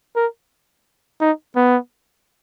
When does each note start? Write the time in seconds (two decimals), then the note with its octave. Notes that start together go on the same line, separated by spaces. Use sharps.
0.16 A#4
1.20 D#4
1.56 B3